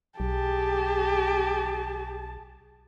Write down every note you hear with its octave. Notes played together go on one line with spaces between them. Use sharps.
B1 G4 G#4 A5